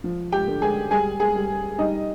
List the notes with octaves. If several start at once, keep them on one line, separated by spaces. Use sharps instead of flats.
F3
G4 G5
D3
G#4 G#5
G3 G#4 G#5
G#4 G#5
G3
G3 D#4 D#5